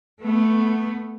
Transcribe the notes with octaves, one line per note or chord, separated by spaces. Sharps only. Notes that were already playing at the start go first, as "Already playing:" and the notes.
A3 B3